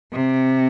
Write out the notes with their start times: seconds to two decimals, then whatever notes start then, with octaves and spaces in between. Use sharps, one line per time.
0.12 C3